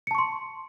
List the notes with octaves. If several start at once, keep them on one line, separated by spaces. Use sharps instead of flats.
A5 C6 C#6 C#7